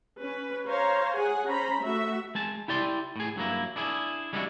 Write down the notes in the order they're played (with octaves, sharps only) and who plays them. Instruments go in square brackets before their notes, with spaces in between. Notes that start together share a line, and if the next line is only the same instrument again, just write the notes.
[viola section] C#4 B4
C5 C#5 F5 A#5
G#4 F#5 G#5
C#4 C5 A#5 B5
A3 F#4 E5
[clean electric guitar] G#3 G#4 A5
E4 G4 D5 C6
A2 G#4
G2 F#3 A#3 E4
D4 E4 G#4
G3 G#3 B3 D4 E4 F#4